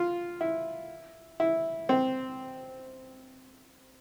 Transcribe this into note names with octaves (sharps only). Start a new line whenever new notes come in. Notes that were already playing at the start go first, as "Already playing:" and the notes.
Already playing: F4
E4
E4
C4